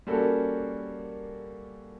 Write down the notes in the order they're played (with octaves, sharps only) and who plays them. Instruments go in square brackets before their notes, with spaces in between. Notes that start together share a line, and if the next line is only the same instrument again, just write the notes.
[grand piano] G3 A#3 C#4 F#4 A4